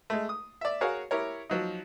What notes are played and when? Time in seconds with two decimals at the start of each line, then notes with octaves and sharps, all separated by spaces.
0.10 G#3 A3
0.29 D#6
0.61 D5 E5
0.81 F#4 G#4 A#4 C#5 F5
1.11 E4 G4 A#4 C#5
1.50 F3 F#3 D#4